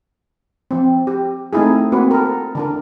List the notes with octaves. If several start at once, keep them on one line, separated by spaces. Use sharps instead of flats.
F3 C4
G4
A3 C4 D#4 E4 G#4
A#3 C4 F#4 B4
A4 A#4
D3 D4 A#4